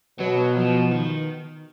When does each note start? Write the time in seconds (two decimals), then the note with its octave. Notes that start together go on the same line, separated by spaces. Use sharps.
0.19 B2 F#3
0.56 F3
0.91 D#3